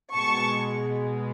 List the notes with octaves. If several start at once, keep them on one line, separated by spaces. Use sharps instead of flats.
B2 G#3 A5 C#6